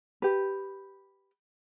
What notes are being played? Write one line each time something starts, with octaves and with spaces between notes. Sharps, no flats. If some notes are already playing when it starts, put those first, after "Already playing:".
G4 B4